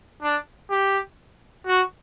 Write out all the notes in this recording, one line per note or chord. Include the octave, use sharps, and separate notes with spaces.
D4
G4
F#4